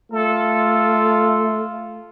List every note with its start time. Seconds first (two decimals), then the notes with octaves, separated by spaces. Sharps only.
0.12 A3 F4 A4